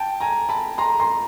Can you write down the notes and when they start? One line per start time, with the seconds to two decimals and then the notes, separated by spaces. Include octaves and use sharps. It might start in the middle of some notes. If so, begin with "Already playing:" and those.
Already playing: G5 A5
0.20 G#5 A#5
0.49 A5 B5
0.78 A#5 C6
1.00 A#5 C6